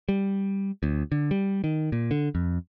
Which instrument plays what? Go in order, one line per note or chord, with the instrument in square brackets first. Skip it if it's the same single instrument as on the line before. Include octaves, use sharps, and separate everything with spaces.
[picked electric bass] G3
D2
D3
G3
D#3
A#2
D3
F2